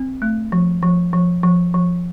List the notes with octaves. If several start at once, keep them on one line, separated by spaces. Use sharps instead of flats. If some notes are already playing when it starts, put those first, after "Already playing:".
Already playing: C4
A3
F3
F3
F3
F3
F3